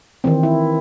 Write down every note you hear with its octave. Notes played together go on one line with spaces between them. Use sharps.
D#3 E3 C4
E4